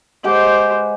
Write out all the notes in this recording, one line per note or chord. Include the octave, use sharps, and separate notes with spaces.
G#3 G4 B4 C5 F#5